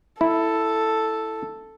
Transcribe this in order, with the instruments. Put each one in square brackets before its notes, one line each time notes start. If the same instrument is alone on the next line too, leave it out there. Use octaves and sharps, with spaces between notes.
[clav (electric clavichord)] E4 [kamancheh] A4